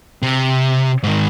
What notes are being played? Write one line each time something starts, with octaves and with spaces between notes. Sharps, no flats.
C3
G#2 D#3